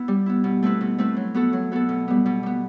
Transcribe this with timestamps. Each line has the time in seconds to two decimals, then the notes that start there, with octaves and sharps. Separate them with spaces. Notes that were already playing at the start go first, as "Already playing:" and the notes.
Already playing: B3 E4
0.08 G3
0.26 B3 E4
0.44 B2
0.63 A3 C4 E4 B4
0.81 B2
0.98 A3 C4 E4 B4
1.17 F#3
1.34 B3 F#4 A4
1.53 F#3
1.72 B3 F#4 A4
1.89 B2
2.08 G3 B3
2.26 B2
2.43 G3 B3